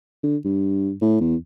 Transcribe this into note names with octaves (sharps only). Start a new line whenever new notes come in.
D3
G2
A2
E2